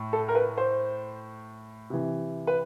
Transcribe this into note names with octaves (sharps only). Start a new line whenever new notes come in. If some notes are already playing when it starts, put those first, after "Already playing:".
Already playing: A2
A4
A#4
B4
C5
C3 E3
B4